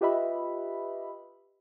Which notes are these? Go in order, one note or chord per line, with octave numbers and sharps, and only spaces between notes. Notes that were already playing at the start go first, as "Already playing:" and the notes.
F4 G4 B4 D#5 E5 B5